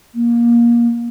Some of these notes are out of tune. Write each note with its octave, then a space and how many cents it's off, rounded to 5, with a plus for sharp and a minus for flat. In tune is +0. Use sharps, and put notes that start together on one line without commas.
A#3 +20